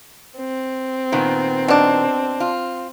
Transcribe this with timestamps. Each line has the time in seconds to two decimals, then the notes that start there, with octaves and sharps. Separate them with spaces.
0.38 C4
1.12 A#2 D#3 B3
1.68 B2 D4
2.40 F4